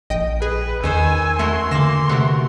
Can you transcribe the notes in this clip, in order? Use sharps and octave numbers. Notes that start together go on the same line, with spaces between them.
A#1 D#5 G5
G#4 B4
E2 D#3 C5 G#5 E6
A3 E4 F#4 A#4 C6
D3 E3 A#3 A#6 E7
C3 A3 F#4 A#4